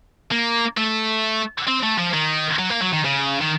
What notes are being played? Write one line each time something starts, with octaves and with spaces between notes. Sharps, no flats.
A#3
A3
C4
A3
F3
D#3
F#3
A#3
F#3
D#3
C#3
D#3